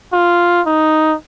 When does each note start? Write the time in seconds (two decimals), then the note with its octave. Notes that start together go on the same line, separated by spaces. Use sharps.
0.13 F4
0.66 D#4